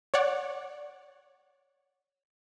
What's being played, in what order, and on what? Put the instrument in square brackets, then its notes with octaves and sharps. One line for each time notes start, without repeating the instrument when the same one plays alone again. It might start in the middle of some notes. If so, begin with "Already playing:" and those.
[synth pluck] C#5 D5 F#5